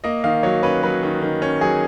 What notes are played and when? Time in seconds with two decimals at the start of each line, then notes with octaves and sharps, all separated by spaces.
0.04 A#3 D#5
0.24 D#3 F5
0.43 F#3 C#5
0.63 C#4 B4
0.83 F#3 B4
1.03 D#3
1.22 D#3
1.42 C#4
1.61 F#3 G#4